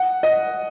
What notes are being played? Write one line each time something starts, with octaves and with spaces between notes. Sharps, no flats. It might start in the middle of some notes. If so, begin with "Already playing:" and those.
Already playing: F#5
D#5